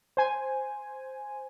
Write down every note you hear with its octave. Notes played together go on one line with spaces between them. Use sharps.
C5 G#5